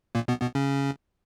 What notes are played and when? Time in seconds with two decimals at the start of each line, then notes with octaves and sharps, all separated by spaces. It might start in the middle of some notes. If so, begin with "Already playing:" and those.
0.15 A#2 A#3
0.28 B2 B3
0.42 B2 B3
0.55 C#3 C#4